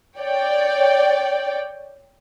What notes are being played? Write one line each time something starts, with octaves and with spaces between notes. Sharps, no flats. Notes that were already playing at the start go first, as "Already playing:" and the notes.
C#5 D5 G5